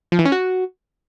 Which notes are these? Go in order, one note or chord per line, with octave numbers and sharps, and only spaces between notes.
F3
E3
C#4
F#4